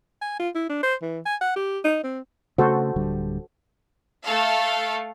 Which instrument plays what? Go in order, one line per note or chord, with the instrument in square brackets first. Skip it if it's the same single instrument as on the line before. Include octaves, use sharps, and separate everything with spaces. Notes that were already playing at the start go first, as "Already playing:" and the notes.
[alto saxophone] G#5
F4
E4
D4
C5
E3
G#5
F#5
G4
D#4
C4
[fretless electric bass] C#3 A3 [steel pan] F#4 A4 C5
[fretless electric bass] D1 D3 G3
[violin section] A3 A4 F5